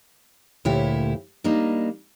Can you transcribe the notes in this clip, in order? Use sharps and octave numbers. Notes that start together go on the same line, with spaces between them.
D2 A#2 E4 F4 G4 C#5
G3 A#3 D4 D#4